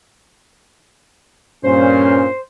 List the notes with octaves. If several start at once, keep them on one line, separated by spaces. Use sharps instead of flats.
G2 A#2 C#4 C5